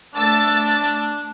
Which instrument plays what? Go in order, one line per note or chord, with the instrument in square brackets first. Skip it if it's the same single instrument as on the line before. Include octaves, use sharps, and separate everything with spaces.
[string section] A3 E6 A6 [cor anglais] D4